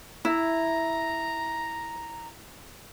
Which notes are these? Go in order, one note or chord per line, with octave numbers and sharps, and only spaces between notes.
E4 A#5